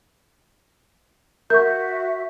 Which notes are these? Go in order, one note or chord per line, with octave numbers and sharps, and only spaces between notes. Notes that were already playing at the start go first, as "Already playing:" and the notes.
F#4 A#4 E5 C#6 G6